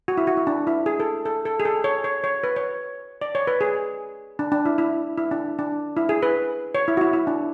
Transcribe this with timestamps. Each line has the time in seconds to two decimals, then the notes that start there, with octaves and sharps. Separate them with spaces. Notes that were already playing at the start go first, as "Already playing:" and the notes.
0.08 F#4
0.17 E4
0.27 F#4
0.37 E4
0.47 D4
0.67 E4
0.86 G#4
1.00 A4
1.26 A4
1.45 A4
1.60 G#4
1.65 A4
1.84 C#5
2.04 C#5
2.24 C#5
2.44 B4
2.56 C#5
3.21 D5
3.35 C#5
3.47 B4
3.61 G#4
4.39 D4
4.52 D4
4.65 E4
4.78 E4
5.18 E4
5.31 D4
5.59 D4
5.97 E4
6.09 G#4
6.22 B4
6.75 C#5
6.88 E4
6.97 F#4
7.01 E4
7.13 E4
7.27 D4